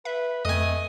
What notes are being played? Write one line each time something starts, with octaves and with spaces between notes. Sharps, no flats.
B4 E5
F2 A3 D#5 G#5